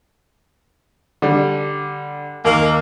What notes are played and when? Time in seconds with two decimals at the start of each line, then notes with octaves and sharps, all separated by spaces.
1.22 D3 G3
2.45 D#2 A#3